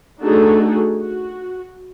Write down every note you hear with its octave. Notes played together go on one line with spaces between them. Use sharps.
A3 D4 D#4 F#4 G#4 A4
F#4